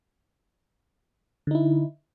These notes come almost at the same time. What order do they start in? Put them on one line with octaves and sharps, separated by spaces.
D3 D#4 E4